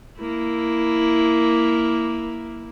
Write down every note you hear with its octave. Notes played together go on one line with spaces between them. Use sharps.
A#3 E4